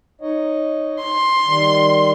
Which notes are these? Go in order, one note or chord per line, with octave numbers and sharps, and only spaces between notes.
D#4 C#5 D#5
C6
D#3 G3